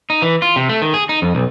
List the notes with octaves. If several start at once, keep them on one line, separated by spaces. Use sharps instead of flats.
D#4
E3
F4
C3
A3
D#3
G#4
D#4
F2
B1